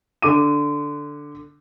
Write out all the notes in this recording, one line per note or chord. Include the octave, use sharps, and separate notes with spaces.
D3 D6 D#7